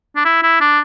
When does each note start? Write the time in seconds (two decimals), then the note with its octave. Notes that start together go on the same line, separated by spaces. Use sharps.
0.16 D4
0.25 E4
0.43 E4
0.61 D4